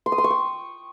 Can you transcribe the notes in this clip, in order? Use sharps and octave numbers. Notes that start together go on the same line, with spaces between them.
C6
D#6
C6
C#6
G5